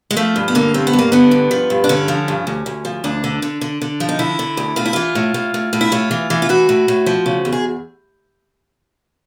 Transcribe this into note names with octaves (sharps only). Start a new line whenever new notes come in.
G#3
F3 A3
G2
B3
D3 A#3
G2 C4
B3
G2
A#3
D3 B3
G2
F3
G2
D4
D3 C#4
F3
G2
D2
D2
F3
D2 D4
D3
D3
D3
D3
F3
D#4
D3 E4
D3
D2
A2 F4
E4
E3 F4
A2
A2
A2
A2
E4
A2 F4
E3
E3
F4
E3 F#4
A2
A2
F3
C#3
E2
G#4